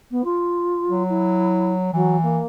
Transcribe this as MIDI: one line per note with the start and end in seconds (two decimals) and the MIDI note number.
0.10 0.21 59
0.24 1.02 65
0.89 1.92 54
1.09 1.72 64
1.93 2.40 52
1.93 2.17 54
2.22 2.47 58